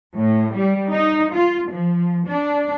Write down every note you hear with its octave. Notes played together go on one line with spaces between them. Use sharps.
A2
G3
D#4
F4
F3
D4